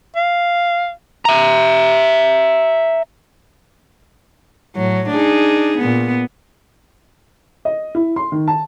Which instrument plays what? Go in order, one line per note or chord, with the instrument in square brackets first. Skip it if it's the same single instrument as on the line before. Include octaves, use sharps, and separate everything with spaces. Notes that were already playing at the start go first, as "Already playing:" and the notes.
[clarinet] F5
[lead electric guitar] E5 A#5
[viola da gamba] A2 F#3
D4 D#4 G#4
A#2 B3
[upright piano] D#5
E4
C6
D#3
A5